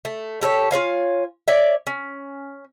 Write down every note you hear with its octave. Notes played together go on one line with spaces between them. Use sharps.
A3
G4 A4 B4 C#5
F4 C#5 F5 G#5
C#5 D5 E5
C#4